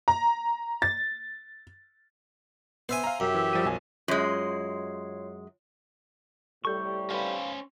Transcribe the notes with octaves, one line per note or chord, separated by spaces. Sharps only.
A#5
A6
B3 C5 E5 G#5
F5 A#5
F#2 G4 E5
E3 E6
F3 G3 D#7
B1 F3 G#5
F#2 G#3 F4 C#5 C7
A2 C3 G3 A4 C#6 G6
C#4 B4 C5 F5